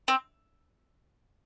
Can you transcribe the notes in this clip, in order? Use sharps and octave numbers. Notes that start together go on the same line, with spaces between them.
C4